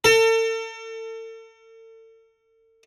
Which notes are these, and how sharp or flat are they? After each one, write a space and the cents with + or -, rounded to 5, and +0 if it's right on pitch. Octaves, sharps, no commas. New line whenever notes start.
A4 +40